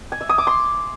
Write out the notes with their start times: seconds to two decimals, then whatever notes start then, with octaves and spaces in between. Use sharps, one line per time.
0.12 G#5
0.21 E5
0.29 D#6
0.38 D6
0.47 C6